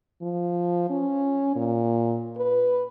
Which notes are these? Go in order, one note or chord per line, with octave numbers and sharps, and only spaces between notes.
F3
C#4
A#2
B4